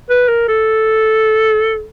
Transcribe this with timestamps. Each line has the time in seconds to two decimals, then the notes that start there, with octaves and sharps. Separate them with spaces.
0.10 B4
0.28 A#4
0.48 A4